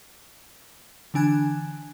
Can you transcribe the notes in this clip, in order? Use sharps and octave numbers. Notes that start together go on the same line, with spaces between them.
D3 E3 D4 G#5 F#6 G#6